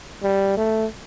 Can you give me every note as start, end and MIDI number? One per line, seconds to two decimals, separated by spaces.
0.23 0.54 55
0.57 0.86 57